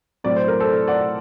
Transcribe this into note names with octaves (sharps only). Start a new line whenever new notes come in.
A2 F#3 C4 D5
C5
A#4
A4 C5
D5 F#5